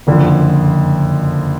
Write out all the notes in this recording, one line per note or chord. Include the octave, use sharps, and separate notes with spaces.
F#1 F2 D3 F3